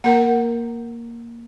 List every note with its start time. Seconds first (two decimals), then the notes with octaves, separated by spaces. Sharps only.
0.04 A#3 A#4 F#5